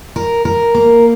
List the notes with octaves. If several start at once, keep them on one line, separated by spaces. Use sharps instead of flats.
A#4
A#4
A#3